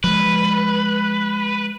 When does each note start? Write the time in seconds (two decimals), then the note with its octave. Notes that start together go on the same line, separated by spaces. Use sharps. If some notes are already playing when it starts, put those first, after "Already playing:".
0.04 F3 G#3 B4